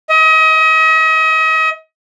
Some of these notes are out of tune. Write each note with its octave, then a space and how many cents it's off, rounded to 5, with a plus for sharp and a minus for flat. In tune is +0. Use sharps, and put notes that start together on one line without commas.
D#5 +35